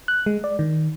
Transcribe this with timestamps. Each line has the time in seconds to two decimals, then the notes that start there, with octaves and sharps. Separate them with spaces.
0.08 F#6
0.26 G#3
0.44 D5
0.59 D#3